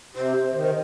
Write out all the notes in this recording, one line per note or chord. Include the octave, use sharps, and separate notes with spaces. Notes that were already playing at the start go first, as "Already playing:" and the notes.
C3 C5
D#3
D3